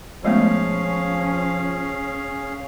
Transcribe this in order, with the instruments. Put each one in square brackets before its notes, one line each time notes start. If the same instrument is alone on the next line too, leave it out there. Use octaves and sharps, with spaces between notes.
[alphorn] F3 [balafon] G#3 A3 B3 [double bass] C#4 [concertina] G#4 F5